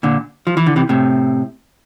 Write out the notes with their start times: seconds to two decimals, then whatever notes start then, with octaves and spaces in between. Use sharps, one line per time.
0.03 A#2 D3
0.47 F3
0.57 E3
0.67 D3
0.76 C3 E3
0.89 A2 C3